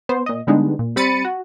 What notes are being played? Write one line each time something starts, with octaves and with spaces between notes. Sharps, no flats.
B3 C5
A#2 D#5
D3 G3 G#3 B3 D4 D#4
A#2
G3 C4 B5 A6 C#7 D#7
F#4